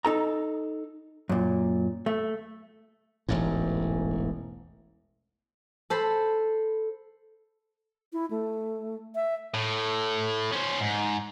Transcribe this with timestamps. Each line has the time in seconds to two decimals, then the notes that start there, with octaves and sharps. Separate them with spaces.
0.05 D#4 A4 A#5
1.29 F#2 A#2
2.06 A3
3.29 E1 A1 G#2
5.90 A4 C5 B5
8.13 E4
8.31 A3
9.15 E5
9.54 A2
10.52 C#4 C5
10.81 G#2